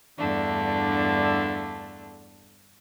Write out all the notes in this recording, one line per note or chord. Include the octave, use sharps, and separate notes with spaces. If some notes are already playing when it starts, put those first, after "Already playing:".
E2 G2 D3 A3 D4